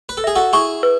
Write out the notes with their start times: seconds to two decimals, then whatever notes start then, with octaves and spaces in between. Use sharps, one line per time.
0.09 B4
0.17 A4
0.24 G#4 E5
0.36 F#4 A4
0.53 E4 G#4 C#6
0.83 B4